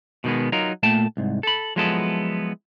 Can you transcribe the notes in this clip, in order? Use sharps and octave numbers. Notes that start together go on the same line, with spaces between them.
B2 D#3 G3 G#3 B3
F#3 D#4 F4 A#4
A#2 A3 G5 A5
C2 G#2
A4 B5
F3 F#3 G#3 B3 E4 A4